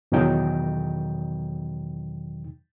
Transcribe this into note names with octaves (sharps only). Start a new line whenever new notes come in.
E2 B2 D#3 F#3 D#4 G5